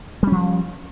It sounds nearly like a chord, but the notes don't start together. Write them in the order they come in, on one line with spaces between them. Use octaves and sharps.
G3 C#4 F3